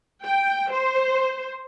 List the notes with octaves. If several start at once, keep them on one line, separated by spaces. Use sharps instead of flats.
G5
C5